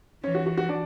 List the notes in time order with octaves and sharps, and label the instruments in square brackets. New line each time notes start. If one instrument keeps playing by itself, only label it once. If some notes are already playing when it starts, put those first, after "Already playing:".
[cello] E3 [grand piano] C#4 C#5
[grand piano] F#4
F#4
F#4
D4 D5